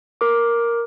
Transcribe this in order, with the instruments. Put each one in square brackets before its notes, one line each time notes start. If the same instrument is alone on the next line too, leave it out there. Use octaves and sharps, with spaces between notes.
[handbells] A#4 D6